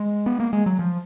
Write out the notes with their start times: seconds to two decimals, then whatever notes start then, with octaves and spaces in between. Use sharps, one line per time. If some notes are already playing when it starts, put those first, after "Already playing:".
Already playing: G#3
0.26 B3
0.40 A#3
0.53 G#3
0.66 F#3
0.79 F3